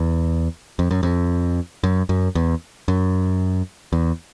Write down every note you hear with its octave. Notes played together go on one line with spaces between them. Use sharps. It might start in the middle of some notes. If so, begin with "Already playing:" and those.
Already playing: E2
F2
F#2
F2
F#2
F#2
E2
F#2
E2